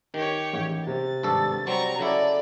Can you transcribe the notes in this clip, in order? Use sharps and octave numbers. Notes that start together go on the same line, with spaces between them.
D#3 G4 C#5
A1
C3 A6
G#1 G2 A4
F#3 G3 C4 A#5 C#6
C#3 F#3 E4 A4 D5